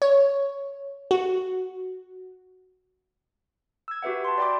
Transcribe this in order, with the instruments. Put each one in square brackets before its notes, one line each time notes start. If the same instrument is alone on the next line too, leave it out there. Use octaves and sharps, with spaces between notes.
[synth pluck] C#5
F#4
[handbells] E6 G#6
F#4 G4 B4 E5 F#5
A5 C6
D5 G5 B5 D6